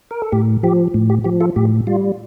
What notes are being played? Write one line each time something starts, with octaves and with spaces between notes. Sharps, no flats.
A#4
A4
A2 G4
F3 G4
A2
G4
F3 G4
F4 A4
A2 G4
G3 F4